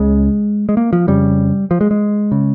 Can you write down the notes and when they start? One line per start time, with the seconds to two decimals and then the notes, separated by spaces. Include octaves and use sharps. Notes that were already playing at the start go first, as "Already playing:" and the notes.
Already playing: C#2 C#3 G#3
0.69 G#3
0.77 A#3
0.93 F3
1.08 F2 C#3 G3
1.71 F3
1.81 G#3
1.91 G#3
2.32 C#3